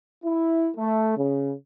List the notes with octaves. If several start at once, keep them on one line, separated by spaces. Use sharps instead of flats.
E4
A3
C#3